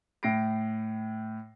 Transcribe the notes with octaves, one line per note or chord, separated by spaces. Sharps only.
A2 A#6 C7 D7